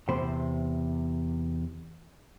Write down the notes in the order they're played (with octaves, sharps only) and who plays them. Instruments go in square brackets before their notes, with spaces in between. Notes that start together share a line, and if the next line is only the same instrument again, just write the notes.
[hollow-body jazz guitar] E2 C3 C5 B5